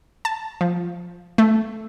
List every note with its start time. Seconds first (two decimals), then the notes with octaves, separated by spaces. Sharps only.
0.25 A5
0.61 F3
1.38 A3